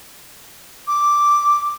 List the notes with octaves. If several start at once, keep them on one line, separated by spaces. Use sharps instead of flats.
D6